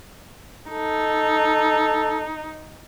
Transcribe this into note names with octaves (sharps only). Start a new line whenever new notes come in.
D#4 A4